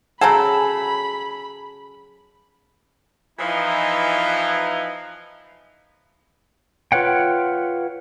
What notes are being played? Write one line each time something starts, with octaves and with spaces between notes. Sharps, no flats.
C#3 F#3 G#4 A4 F#5 G#5 A#5 B5
E3 F3 D#4
F4 B4 C#5 F#5 G5